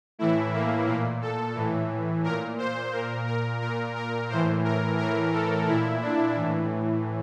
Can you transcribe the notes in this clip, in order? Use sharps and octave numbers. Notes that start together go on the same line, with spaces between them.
A2 E3 E4
A#3
A#2 A#3
A4
A2 E3
A#2 A#4
C5
A#2 A#4
A#4
A#2 A#4
A#4
A2 E3 C5
A#4
A2 E3 A#4
A4
A#2 E4
D4
A2 E3